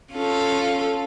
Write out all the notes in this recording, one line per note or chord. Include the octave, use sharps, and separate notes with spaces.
C#4 F4 A4